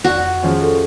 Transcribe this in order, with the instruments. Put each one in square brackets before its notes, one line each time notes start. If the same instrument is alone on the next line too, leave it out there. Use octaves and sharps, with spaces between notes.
[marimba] F2 D5 [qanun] F#4
[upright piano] F3 G#3 C#4
[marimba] A4